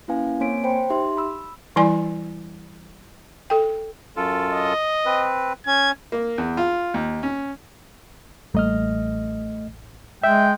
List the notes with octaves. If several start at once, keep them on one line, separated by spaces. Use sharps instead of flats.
A#3 C#4 E4 B4 F5 G#5
A#3 C4 C#5 G#5 B6 D7
C5 G5 B5
D#4 G4 E5 C6
B5 E6
E3 G3 E4 D5 G#5 C6
A4 G5
F#2 F4 A4
D#5
C4 B4
C#4 G#6
A#3
E2
F4
D#2
C#4
A1 G3 A3 A#3 D#5 F6
G#3 E5 G5